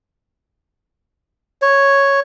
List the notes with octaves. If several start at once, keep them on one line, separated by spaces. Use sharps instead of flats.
C#5